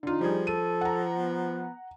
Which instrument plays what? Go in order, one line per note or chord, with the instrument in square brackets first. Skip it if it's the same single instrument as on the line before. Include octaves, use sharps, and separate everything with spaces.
[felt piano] D3 F4 [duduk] D#4
[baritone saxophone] F3 [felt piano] G3 G#4
[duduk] A4 [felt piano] D#7
[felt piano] F#5 A#5
[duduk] B3